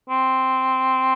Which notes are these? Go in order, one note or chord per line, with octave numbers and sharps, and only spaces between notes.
C4